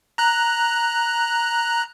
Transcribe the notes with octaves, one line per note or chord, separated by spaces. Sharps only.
A#5 F#6